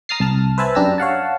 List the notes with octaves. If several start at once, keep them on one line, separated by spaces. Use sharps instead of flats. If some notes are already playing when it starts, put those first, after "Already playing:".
A#5 D#6 F6 A6 C7
C2 A5 F6
B4 C5 E5 G#5 A5 B5
F#2 D4 G4 A#5 E6
C#5 F5 F#5 A5